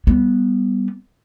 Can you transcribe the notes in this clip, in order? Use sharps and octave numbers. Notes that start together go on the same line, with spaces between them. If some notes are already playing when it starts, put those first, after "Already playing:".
G3 B3